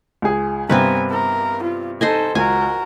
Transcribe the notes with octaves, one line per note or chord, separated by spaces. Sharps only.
C#2 G#4
G2 C3 B3 C4 A#4 B4 G#5
A#4
F4
D#4 A4 C5 D#5 G#5
C#2 F#4 A#4 G#5